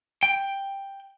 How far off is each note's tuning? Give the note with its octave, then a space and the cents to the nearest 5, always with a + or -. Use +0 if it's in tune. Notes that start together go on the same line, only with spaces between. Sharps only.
G5 +5